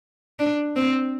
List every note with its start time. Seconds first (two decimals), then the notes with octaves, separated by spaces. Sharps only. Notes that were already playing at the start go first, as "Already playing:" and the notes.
0.40 D4
0.76 C4